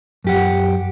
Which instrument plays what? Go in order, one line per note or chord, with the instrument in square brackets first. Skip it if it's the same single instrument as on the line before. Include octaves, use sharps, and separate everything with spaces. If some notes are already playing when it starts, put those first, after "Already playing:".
[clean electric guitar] F#2 G4 F#5